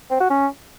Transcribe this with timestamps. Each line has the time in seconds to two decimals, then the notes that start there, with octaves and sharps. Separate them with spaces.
0.10 C4
0.20 F#4
0.30 C#4